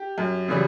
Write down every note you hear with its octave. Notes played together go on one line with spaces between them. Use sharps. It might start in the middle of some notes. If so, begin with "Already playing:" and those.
Already playing: G4
F#2
C#3 E3 G3